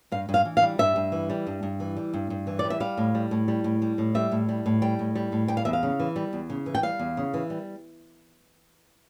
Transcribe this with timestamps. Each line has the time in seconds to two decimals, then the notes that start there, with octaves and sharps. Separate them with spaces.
0.12 G2 F5
0.29 G2
0.34 F5
0.45 E3
0.57 F5
0.62 G3
0.78 G2 E5
0.96 G2
1.12 E3
1.30 G3
1.47 G2
1.63 G2
1.80 E3
1.97 G3
2.14 G2
2.30 G2
2.47 E3
2.59 D5
2.64 G3
2.70 E5
2.80 G3 F5
2.97 A2
3.15 G3
3.31 A2
3.48 G3
3.64 A2
3.82 G3
3.98 A2
4.15 G3 E5
4.32 A2
4.49 G3
4.66 A2
4.82 G3 G5
4.99 A2
5.15 G3
5.32 A2
5.48 G3 G5
5.57 F5
5.65 E2 E5
5.73 F5
5.83 C#3
6.00 E3
6.16 G3
6.33 E2
6.50 C#3
6.66 E3
6.75 G5
6.83 G3 F5
6.99 E2
7.17 C#3
7.34 E3
7.50 G3